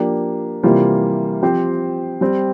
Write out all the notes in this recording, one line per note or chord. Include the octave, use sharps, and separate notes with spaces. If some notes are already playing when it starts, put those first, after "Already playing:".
Already playing: F3 A#3 D4 G4
C3 E3 G3 A#3 F4
F3 C4 G4 C5
G3 C4 G4